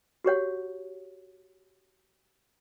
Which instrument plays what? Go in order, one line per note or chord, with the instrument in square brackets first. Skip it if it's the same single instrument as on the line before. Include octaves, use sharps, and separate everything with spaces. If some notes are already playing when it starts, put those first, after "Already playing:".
[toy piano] F#4 G4 C#5 F#5